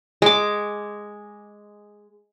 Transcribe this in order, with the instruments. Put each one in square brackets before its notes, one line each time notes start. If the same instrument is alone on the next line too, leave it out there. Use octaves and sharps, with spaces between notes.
[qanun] G#3 D6